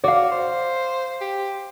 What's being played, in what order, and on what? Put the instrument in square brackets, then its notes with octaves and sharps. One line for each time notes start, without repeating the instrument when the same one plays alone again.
[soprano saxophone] F#4 [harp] D5 F5
[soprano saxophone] C5
G4